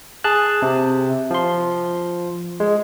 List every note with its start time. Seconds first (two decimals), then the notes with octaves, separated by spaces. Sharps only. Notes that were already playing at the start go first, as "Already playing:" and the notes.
0.24 G#4 A5 F#6
0.62 C3
1.31 F3 C6
2.60 G#3